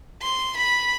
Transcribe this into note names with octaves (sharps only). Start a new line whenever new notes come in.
C6
B5